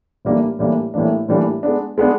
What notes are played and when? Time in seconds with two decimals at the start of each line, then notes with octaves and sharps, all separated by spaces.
0.25 A2 E3 G3 A#3 D4
0.59 A2 E3 G3 A#3 D4
0.94 A2 E3 G3 A#3 D4
1.28 A2 E3 G3 A#3 D4
1.63 G#3 B3 D4
1.98 G#3 B3 D4